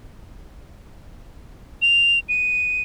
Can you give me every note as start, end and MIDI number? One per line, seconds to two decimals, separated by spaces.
1.82 2.19 101
2.29 2.83 99